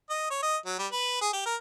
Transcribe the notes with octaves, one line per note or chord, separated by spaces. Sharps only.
D#5
C#5
D#5
F#3
G3
B4
G#4
G4
A#4